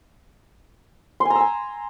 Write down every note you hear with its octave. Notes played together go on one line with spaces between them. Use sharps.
C6
G#5
A#5
E6
G#5